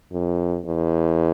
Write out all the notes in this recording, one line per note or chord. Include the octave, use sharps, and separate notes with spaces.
F2
E2